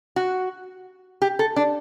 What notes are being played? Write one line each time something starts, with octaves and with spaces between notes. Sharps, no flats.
F#4
G4
A4
D4